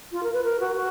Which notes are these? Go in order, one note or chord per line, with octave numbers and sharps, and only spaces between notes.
F4
A#4
B4
A#4
F#4
F#4